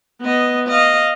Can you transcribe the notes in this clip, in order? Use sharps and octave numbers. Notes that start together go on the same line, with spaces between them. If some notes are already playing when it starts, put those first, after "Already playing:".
B3 D#5
D#5 F5